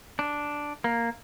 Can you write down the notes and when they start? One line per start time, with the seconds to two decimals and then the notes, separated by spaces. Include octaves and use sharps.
0.19 D4
0.84 A#3